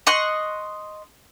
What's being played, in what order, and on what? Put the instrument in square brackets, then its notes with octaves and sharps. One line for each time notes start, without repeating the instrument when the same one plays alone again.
[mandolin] D#5 C6 C#6 F#6